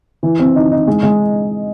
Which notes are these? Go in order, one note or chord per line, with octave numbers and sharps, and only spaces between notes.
E3
C4
D#4
D#4
G#3
G#3